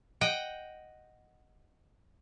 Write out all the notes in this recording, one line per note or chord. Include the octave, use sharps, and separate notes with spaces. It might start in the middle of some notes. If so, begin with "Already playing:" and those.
D#5 F#5 G5